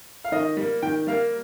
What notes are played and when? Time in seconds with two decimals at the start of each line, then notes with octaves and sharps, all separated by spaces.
0.24 F5
0.32 D#3 D#5
0.57 G3 A#3
0.82 D#3 G5
1.07 G3 A#3 F5